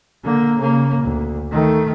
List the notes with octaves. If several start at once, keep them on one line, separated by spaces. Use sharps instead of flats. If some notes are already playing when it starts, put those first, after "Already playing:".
D3 A#3
C#3 A#3
D2
D#3 A3